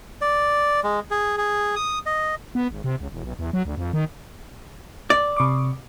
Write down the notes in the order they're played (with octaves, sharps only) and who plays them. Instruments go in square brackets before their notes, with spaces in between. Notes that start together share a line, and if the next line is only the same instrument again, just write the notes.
[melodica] D5
G#3
G#4
G#4
D#6
D#5
[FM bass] B3
G#1
C3
C#2
E1
B1
E2
F#3
D2
F2
D#3
[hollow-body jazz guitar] D5
[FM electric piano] C3 C#6 D6